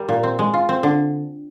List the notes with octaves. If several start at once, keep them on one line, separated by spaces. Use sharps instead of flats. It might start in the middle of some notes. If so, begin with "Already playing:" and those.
Already playing: G3 A#4
A#2
C4
G#3
F4
C4
D3